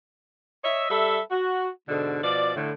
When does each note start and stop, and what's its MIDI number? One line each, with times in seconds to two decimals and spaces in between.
0.64 0.87 73
0.64 0.87 75
0.64 0.87 76
0.89 1.19 55
0.89 1.19 69
0.89 1.19 71
0.89 1.19 76
1.31 1.68 66
1.88 2.19 44
1.88 2.19 47
1.88 2.19 50
2.23 2.53 47
2.23 2.53 53
2.23 2.53 74
2.56 2.70 45
2.56 2.70 50